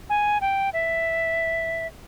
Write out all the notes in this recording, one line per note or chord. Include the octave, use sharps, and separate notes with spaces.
G#5
G5
E5